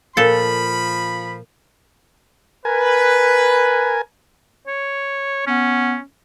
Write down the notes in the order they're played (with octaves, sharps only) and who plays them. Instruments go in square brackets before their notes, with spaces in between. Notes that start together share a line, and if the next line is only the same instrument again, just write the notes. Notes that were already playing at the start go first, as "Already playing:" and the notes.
[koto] A#2 A4 [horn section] F3 B5
[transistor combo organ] A#4 G#5 [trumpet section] B4
[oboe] C#5
[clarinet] B3 [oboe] C#4